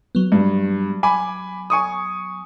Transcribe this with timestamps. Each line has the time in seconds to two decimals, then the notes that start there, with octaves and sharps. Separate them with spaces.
0.15 F#3 B3
0.32 G2
1.03 G#5 B5 D6
1.70 G#5 C#6 D#6